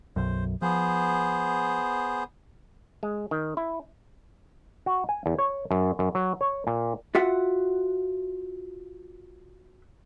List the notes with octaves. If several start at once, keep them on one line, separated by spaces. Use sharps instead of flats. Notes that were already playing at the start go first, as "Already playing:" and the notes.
B1 F#2 C5
F3 B3 G#4 C5
G#3
D#3
E4
F#4
G#5
E2
C#5
F#2
F#2
F#3
C#5
A#2
F4 F#4 E5 F#5